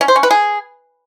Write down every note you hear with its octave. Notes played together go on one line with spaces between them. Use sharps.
C#4
C5
C#4
B4
G#4